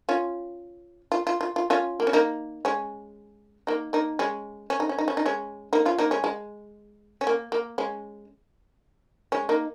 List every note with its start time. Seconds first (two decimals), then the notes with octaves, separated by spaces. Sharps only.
0.09 C#4 F4
1.12 F4
1.27 F4
1.41 F4
1.56 F4
1.70 C#4 F4
2.00 A#3
2.07 C#4
2.13 A#3 D#4
2.65 G#3 C#4
3.67 A#3 D#4
3.93 A#3 D#4
4.19 G#3 C#4
4.70 C#4
4.80 D#4
4.89 C#4
4.98 D#4
5.08 C#4
5.17 D#4
5.26 G#3 C#4
5.73 A#3 D#4
5.85 C#4 F4
5.98 A#3 D#4
6.11 G#3 C#4
6.24 G#3
7.21 C#4
7.27 A#3
7.52 A#3
7.78 G#3 C#4
9.32 G#3 C#4
9.49 A#3 D#4